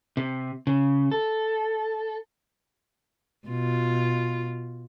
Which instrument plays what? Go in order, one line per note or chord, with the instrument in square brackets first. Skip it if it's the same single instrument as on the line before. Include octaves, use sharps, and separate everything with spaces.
[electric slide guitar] C3
C#3
A4
[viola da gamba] B2 F4